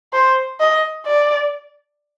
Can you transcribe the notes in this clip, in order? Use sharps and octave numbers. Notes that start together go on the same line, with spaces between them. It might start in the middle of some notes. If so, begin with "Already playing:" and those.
C5
D#5
D5